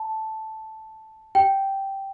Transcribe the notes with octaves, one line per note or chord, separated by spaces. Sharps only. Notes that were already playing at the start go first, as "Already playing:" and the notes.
Already playing: A5
G5